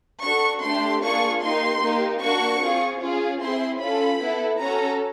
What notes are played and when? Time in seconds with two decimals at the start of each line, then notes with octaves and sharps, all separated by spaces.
0.23 D4 F#4 A4 C#6
0.62 A3 D4 G4 C6
1.03 A#3 D4 F4 G#4 C#6
1.42 A#3 D#4 G4 C6
1.82 A#3 D#4 G4
2.21 A#3 D4 F#4 C#6
2.61 C4 F4 G#4
3.01 C#4 F4 G#4
3.40 C4 E4 G#4 C6
3.80 C#4 F4 A4 B5
4.20 B3 E4 A4
4.59 C#4 F#4 A4 A#5